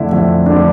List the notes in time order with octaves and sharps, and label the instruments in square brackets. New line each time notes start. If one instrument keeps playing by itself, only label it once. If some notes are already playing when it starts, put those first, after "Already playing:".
Already playing: [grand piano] F2 D3 A3 D4 E4
F2
D3 A3 D4